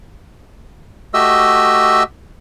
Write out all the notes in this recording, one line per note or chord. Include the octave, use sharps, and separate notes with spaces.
A3 F#4 G4 D#5 E5 E6